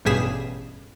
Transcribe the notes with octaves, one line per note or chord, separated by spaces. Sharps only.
A1 G2 B2 G#4 B6 E7